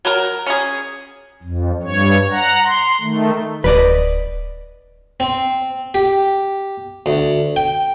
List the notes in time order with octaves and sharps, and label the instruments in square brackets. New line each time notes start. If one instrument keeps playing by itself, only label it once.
[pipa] F#3 A#4
C#4 G#4
[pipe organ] F2
G2 C#5
F#5 A#5
C6
D#3 A3
[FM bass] D1 [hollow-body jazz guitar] B4 D5 D#5
[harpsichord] C4
G4
D2
G5